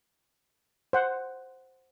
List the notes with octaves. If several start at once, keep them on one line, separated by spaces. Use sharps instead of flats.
C5 F#5